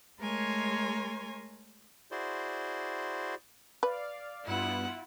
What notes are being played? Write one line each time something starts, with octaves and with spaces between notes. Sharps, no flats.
G#3 A3 A#4 C#5 G#5 C6
E4 F#4 G#4 C5 D5 C6
B4 D5 F5
G2 B3 E4 F4 F#5